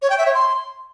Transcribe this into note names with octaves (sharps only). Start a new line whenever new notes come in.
C#5
G5
E5
C#5
C6